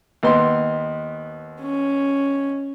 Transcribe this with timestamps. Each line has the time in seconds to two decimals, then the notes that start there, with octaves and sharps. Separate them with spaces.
0.23 D#2 B3 C6
1.61 C#4